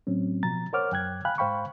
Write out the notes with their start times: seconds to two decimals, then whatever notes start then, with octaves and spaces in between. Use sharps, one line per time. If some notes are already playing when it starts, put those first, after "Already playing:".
0.07 A2 F#3 C4 C#4
0.43 B2 F3 A#5 A6
0.73 A#4 C5 C#5 F#5 D6 F6
0.92 F#2 G5 F#6 G#6
1.25 F5 G5 G#5 B5 F#6
1.38 G#2 C5 F5 G5 B5 C#6